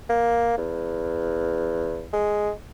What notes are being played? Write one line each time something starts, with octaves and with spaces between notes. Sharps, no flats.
A#3
E2
G#3